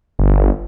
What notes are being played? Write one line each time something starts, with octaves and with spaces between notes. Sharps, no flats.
G1